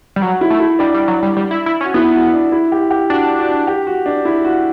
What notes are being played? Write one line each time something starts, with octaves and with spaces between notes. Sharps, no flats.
G3
F#3 F#4
E4
A3
E4
G3 D4
G3
F#3
G3
G3
E4
E4
C#4
F#4
B3 E4
F#4
D4
E4
G4
G4
D4 F#4
F#4
G4
F#4
D4
E4
F#4